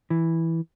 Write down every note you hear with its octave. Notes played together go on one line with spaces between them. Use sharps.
E3